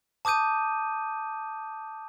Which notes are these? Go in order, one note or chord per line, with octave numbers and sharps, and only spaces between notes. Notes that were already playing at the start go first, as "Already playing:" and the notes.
A5 D6 D#6 G6 D#7